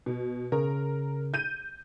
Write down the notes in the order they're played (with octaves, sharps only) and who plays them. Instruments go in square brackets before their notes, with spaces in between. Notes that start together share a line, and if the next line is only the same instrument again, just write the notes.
[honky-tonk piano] B2
[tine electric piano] C#3 [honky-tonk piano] A#4
[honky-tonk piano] G6 D#7